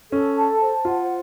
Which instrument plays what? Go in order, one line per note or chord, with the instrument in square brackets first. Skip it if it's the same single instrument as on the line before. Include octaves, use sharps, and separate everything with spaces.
[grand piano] C#4 [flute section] A4
[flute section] A5
C5
[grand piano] F4 [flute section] F#5